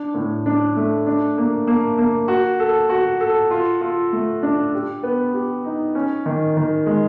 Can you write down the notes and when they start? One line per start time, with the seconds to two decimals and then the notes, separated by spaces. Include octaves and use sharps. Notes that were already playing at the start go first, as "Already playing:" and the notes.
Already playing: D4
0.14 A2
0.46 D4
0.76 A3
1.07 D4
1.38 A#3
1.67 A#3
1.98 A#3
2.28 F#4
2.60 A4
2.89 F#4
3.20 A4
3.51 F4
3.81 F4
4.12 A3
4.43 D4
4.74 G4
5.03 B3
5.34 G4
5.64 D#4
5.95 C#4
6.26 D#3
6.57 D#3
6.86 G#3